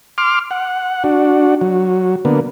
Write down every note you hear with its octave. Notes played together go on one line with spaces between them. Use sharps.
C6 D6 F6
F#5
D4 F#4
F#3
D3 A#3 B3